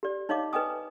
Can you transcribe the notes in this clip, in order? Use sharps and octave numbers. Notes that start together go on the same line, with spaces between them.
G4 D5
D#4 C#5 D#5 F5 D6
B4 D#5 G5 G#5 D#6